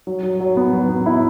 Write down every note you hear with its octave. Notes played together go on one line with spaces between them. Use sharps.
F#3
F#3
F#3
B3
F#3
B3
E4